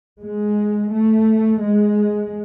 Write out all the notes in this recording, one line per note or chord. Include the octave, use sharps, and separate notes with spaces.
G#3
A3
G#3